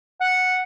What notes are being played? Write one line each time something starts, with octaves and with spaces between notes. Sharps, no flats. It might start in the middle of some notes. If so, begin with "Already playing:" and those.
F#5